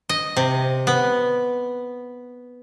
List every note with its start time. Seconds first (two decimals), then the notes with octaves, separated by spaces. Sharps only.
0.09 D#5
0.37 C3
0.87 B3